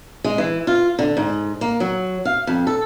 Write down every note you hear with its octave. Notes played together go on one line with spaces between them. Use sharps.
G#3
E3
F4
D3
G#2
A#3
F#3
F5
F2
A4